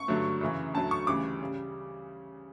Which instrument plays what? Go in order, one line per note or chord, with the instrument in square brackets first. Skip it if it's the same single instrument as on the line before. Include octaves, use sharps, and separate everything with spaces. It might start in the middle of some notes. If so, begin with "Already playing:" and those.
Already playing: [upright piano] C#6
G2 D3 F#3 A3
F#2 C#3 E3
D2 D3 F#3 A3 A5
C#6
D2 C#3 E3 G3 D6
C#3 G3